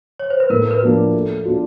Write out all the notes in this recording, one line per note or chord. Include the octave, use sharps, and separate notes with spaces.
C#5
C5
B4
A2 A#4
A#4
B4
F3 A#3 D4
A3
D4 F4